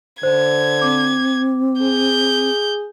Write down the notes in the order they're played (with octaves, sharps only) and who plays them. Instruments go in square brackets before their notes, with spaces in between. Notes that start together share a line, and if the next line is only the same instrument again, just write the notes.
[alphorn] D3 [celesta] C5 [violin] G#6
[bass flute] C4 [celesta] D6
[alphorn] G#4 [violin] G6